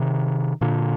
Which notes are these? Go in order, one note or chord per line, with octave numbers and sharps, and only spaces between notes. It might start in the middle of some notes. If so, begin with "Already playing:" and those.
Already playing: C3 D#3
A#2 D3